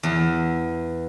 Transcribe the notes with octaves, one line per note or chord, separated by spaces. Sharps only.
E2